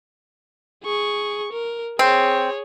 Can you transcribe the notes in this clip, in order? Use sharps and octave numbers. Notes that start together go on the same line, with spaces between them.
G#4 C#6
A#4
C4 G#4 C#5